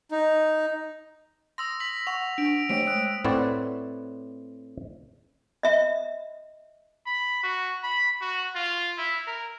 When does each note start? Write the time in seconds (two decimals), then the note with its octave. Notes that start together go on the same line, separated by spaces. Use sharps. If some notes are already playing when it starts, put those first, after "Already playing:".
0.11 D#4
1.58 C6 D#6 E6 A#6
1.80 B6 F#7
2.07 F#5 C#6 F7
2.38 D4 D7
2.69 G#3 A3 C5 C#5 G5 D7
2.87 D#6 E6 F#6
3.24 A2 C4 B4 C#5 D5 F#5
5.63 D#5 E5
7.06 B5
7.43 F#4
7.83 B5
8.21 F#4
8.56 F4
8.98 E4
9.27 A#4